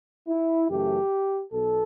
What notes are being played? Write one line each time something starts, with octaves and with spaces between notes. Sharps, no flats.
E4
F#2 C#3 E3 A3 G4
B1 B2 A4